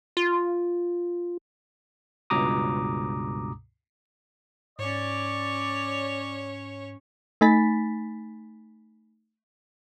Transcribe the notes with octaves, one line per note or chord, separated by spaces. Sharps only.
F4
C#2 G2 B2 A#5 D6 D#6
G#2 C#4 C#5 D5
A3 D#4 G#5 B5 A6 B6